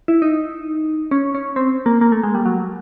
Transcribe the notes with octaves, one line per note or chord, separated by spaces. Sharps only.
E4
D#4
C#4
C#4
C4
A#3
A#3
A3
G#3
G3
F#3